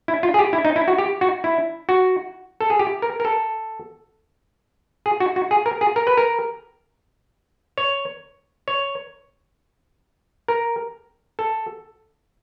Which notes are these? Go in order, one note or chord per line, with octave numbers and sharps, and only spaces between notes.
E4
F4
G#4
G4
E4
D#4
E4
F#4
G4
F#4
E4
F#4
A4
G#4
G4
A#4
A#4
A4
G#4
F#4
F#4
G#4
A#4
G#4
A#4
B4
A#4
C#5
C#5
A#4
A4